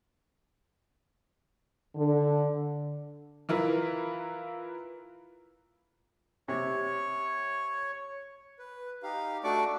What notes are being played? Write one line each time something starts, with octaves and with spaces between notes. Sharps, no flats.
D3
E3 E4 F4 A#4 B4
C3 C#5
B4
D#4 G4 F5
A3 D4 F#4 D5 C#6 D6